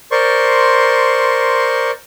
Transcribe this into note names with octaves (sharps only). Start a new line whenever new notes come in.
A#4 C5 D5 C6 C#6